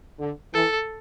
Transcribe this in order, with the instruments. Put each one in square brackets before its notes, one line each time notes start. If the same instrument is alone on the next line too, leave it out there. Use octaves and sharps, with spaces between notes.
[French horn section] D3
[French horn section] E3 [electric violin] A4